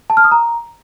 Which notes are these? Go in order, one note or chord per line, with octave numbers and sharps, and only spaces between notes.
A5
F6
D#6
A#5